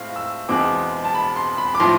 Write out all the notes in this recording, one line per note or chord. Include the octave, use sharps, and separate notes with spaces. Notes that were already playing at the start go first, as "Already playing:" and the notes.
Already playing: A2 G#3 C4 F5
E6
E1 E2 B2 G#3 C4 D6
A5
B5
C6
B5
D6
A2 F3 C6